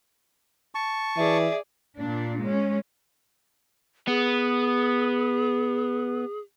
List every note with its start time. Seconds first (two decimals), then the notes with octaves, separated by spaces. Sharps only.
0.75 A5 C#6
1.17 E3 G#4 D5 E5
1.98 A#2 D4
2.43 G#3 C#4
4.08 B3 G#4